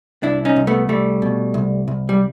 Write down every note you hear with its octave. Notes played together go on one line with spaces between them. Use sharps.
C2 D4 E4
C#4 D#4
C2
A3 B3
C2 G3 A3
B2
C2
C2
G3